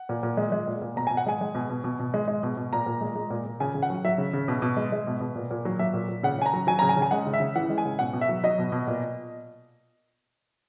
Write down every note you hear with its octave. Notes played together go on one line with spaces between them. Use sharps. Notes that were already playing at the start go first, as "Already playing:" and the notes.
Already playing: F#5
A#2
A#2
G#3
G#3
A#2
A#2
B2 A#5
B2 G#5
F#5
G#3 G#5
G#3
B2
B2
B2
B2
G#3
G#3
B2
B2
A#2 A#5
A#2
G#3
G#3
A#2
A#2
C#3 G#5
C#3
F#5
F#3
F#3 E5
C#3
C#3
B2
B2
G#3
G#3
B2
B2
A#2
A#2
F#3
F#3 E5
A#2
A#2
C#3 F#5
C#3 G#5
A#5
F#3
F#3 G#5
C#3 A#5
G#5
C#3
G#5
G#3 F#5
C#3
E5
C#3
E3 F#5
G#3
G#5
C#3
B2 F#5
B2
E5
F#3
F#3 D#5
B2
B2
A#2